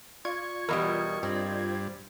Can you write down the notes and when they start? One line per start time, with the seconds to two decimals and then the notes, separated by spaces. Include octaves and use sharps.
0.25 F4 D5 C#6 G#6
0.69 E2 B2 G3 A#4 D#5 D#6
1.23 G2 C4